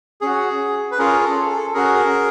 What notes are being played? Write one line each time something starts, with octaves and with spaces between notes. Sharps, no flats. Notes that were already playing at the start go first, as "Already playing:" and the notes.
C#4 F#4 G#4
B4
C#4 F4 G#4 A#4
A4
A4
C#4 F#4 G#4 A#4